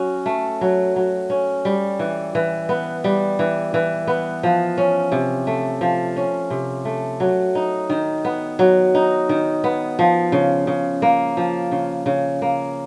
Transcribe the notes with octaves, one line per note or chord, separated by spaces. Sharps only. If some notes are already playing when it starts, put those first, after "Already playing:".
Already playing: F#3 C#4
A3
F#3
F#3
C#4
G3
E3
E3
B3
G3
E3
E3
B3
F3
C#4
C3
A3
F3
C#4
C3
A3
F#3
D#4
D#3
B3
F#3
D#4
D#3
B3
F3
C#3
C#3
A#3
F3
C#3
C#3
A#3